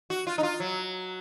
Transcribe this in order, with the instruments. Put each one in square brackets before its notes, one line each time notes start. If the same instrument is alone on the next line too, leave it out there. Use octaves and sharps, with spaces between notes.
[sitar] F#4
F4
D#4
F4
F#3